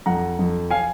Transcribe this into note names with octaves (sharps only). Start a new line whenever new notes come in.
F2 F#5 A#5
F2
F5 G#5